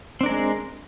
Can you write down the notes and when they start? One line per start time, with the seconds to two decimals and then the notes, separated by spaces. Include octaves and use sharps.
0.21 C4
0.23 D4
0.26 A#4
0.29 G#3